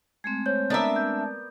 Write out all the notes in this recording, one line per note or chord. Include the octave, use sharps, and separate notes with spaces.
G#3 A3 C4 G#6
C5 C#5 G6
B3 D4 A#4 D5 E5
G6